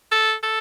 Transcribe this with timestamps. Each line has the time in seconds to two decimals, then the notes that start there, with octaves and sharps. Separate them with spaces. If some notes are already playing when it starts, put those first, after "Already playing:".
0.11 A4
0.43 A4